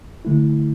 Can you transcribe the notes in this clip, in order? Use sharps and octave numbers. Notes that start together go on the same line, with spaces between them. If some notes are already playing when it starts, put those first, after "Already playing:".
D3 A3 E4